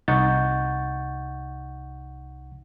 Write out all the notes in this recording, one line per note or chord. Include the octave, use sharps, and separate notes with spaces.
C2 D#4 F#5 C#6 G6 A6